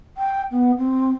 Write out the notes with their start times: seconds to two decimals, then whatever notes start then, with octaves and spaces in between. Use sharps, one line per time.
0.17 G5
0.52 B3
0.78 C4